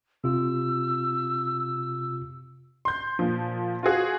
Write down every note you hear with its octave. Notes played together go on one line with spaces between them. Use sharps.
C3 F4 E6
C6 G6
A#2 F3
F4 F#4 G#4 G#5